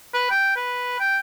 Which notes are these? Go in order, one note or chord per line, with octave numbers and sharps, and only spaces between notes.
B4
G5
B4
G5